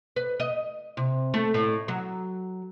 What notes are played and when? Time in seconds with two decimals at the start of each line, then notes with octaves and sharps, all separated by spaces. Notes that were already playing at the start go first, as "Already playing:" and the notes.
0.16 B4
0.40 D#5
0.97 C3
1.34 A3
1.54 A2
1.88 F#3